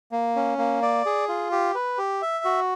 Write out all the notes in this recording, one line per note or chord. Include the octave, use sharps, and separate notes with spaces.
A#3
C#4
A#3
D5
G#4
F4
G4
B4
G4
E5
F#4